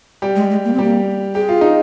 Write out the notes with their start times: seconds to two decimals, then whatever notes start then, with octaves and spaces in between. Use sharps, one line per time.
0.22 G3 G4
0.36 G#3
0.50 G#3
0.65 A#3
0.73 C4
0.79 G3 A#3 G4
1.35 G4 G#4
1.49 F4
1.61 D#4